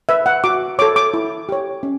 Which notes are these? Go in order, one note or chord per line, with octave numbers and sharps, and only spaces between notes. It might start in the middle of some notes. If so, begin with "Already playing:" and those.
B4 E5
F#5
F#4 D6
A4 C#5 D6
D6
E4
G4 C#5
C#4